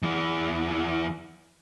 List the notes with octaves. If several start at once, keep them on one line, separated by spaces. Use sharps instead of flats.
E2 E3